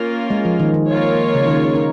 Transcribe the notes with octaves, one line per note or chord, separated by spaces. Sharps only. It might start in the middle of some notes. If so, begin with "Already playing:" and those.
Already playing: A#3 C#4 F4 A#4
G#3
F3
D#3
D#3
A#3 F4 A#4 C#5
C#3
D#3
D#4